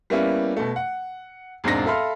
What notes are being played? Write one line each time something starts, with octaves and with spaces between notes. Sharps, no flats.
G3 A#3 B3 C#4 E4
B2 A3
F#5
E1 G#2 C4 D4 A#6
A4 E5 F5 B5 C6 F6